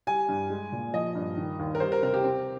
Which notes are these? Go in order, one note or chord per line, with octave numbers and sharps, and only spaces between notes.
G3 G#5
G2
G#3
A#2
F3 D#5
G2
D#3
D#2
A#4
G3 C5
A#4
C3 A#4
G4
C4